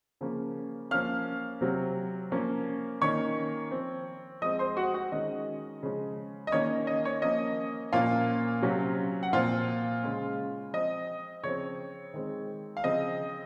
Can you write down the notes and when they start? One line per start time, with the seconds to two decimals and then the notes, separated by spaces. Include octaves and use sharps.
0.21 C#3 F3 A#3 C#4
0.91 F3 A#3 C#4 F5 F6
1.61 C3 F#3 C4
2.32 F3 A#3 C#4
3.01 D#3 A#3 C#4 C#5 C#6
3.71 F3 C4
4.42 F3 G#3 C4 D#5 D#6
4.59 C5 C6
4.77 F#4 F#5
4.94 F#4 F#5
5.12 D#3 G#3 C#4 D#5
5.83 C#3 F3 G#3 C#4
6.47 D#5
6.52 D#3 A#3 C#4 C#5
6.87 D#5
7.05 C#5
7.22 F3 A#3 C#4 D#5
7.93 A#2 F3 A#3 C#4 F4 F5
8.63 C3 F#3 C#4
9.23 F#5
9.33 A#2 F3 C4 F4 F5
10.03 C#3 G#3 C#4
10.73 F3 C4 D#5
11.43 C#3 F3 C4 C#5
12.14 D#3 G#3 C4
12.77 F5
12.84 C#3 F3 C4 D#5